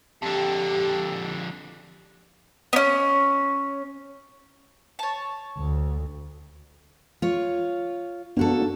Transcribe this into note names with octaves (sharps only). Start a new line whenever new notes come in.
F2 D3 G4
B3 C#4
C#5 A5
D2
F4 C#5
A#3 B3 D4 F#4 A4